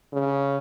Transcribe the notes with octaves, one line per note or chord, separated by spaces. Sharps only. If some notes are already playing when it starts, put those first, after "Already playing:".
C#3